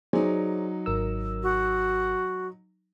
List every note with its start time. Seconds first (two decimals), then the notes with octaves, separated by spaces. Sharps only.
0.13 F#3 D#4 G#4 C5 D5
0.86 G#1 A#4 E6
1.43 F#4